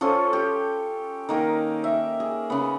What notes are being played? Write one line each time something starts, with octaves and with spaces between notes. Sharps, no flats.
F3 C#4 F4 A4
G4
D#3 A#3 A#4
E5
G#4
C#3 B3